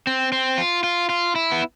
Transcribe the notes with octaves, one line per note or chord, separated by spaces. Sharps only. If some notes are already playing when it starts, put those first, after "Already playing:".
C4
C4
F4
F4
F4
E4
B3